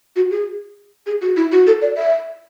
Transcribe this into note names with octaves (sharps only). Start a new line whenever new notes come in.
F#4
G#4
G#4
F#4
E4
F#4
A4
D5
E5